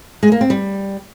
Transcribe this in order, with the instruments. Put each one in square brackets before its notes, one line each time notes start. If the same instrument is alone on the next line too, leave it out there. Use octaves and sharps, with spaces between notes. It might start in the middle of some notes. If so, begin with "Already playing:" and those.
[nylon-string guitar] G#3
A#3
C4
G3